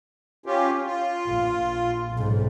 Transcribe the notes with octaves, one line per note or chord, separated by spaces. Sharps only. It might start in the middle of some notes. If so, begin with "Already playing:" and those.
C#4 F4 G4
F4
A#1
B1 G#2